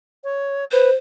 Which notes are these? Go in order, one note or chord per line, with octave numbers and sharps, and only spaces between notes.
C#5
B4 C5